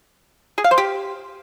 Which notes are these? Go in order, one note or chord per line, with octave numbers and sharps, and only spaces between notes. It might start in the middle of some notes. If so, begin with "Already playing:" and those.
G#4
F5
C5
G4